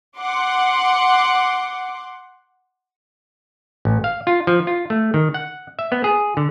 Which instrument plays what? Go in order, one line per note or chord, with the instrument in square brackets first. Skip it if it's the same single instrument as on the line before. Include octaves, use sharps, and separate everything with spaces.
[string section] F#5 C6 D6
[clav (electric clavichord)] A1
F5
F4
F3
F4
A3
D#3
F#5
E5
B3
G#4
D3